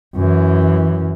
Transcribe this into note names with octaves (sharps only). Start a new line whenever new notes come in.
F#2 E3